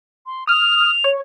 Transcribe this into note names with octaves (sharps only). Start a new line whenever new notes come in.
C6
D#6 F6 F7
C#5